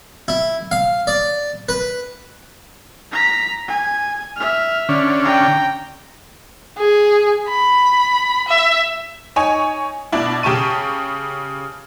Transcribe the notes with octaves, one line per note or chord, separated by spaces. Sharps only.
E4
F5
D5
B4
A#5 B6
G#5
E5 F6
D3 C#4
G5 A#5
G#4
B5
E5
D#4 C#5 G#5
B2 D4 E4
C#3 G4 A5 C#6 D#7